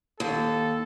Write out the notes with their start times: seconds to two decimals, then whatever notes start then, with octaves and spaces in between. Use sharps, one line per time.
0.20 D#2 A4